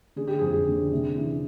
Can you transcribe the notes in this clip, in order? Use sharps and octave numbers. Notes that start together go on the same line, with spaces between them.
D3 G#4
G4
F2 G#4
D3
C3
E3